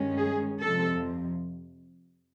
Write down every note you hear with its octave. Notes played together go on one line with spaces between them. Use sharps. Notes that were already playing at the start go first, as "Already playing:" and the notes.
Already playing: G2 D#3 G#3 C#4
G#4
F2 C3 F3 A4